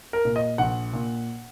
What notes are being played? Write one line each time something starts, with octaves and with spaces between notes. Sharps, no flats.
A#4
A#2
D#5
A#1 F#5
A#2